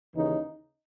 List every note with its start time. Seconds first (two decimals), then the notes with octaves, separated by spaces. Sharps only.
0.15 D#2 C#3 E3 D#4